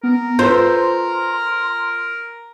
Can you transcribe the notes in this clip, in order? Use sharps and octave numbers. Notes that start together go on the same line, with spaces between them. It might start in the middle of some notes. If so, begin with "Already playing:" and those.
B3 A#4
F4 A4 B4 C5 C6